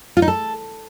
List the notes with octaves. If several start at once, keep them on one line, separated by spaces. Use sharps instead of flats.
F4
D#4
A4